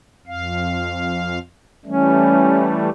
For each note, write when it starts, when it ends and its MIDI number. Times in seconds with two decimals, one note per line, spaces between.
0.27 1.39 41
0.27 1.39 77
1.86 2.89 52
1.86 2.89 55
1.86 2.89 57
1.86 2.85 61